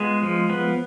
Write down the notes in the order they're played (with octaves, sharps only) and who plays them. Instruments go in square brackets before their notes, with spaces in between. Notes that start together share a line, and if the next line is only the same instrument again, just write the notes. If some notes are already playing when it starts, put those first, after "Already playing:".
Already playing: [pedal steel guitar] G#3 B3 F4
F3
B3